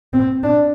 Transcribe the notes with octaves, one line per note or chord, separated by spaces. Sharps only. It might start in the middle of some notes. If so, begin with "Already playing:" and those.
C4
D4